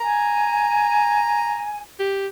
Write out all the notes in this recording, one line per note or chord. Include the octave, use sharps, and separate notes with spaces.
G#5 A#5
G4